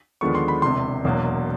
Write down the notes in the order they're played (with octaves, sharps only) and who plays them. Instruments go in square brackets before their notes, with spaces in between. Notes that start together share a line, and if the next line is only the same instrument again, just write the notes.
[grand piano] D#2 D3 F3 G#3 B3 C#6
C6
B5
E1 E2 C3 C6
E1 E2 B2 F#3 A#3